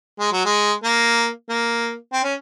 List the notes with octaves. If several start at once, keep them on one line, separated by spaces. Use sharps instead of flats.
G#3
F#3
G#3
A#3
A#3
C4
C#4